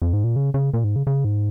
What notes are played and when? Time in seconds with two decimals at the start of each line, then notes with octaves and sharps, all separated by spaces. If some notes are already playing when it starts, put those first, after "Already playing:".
0.02 F2
0.13 G#2
0.24 A#2
0.36 C#3
0.54 C#3
0.74 A#2
0.84 G#2
0.96 C#3
1.07 C#3
1.25 G#2